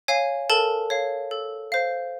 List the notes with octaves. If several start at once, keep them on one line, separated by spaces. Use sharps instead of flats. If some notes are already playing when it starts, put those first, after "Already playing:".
C#5 F5 G#5
A4 A#4 A5
C#5 F5
A4
C5 F5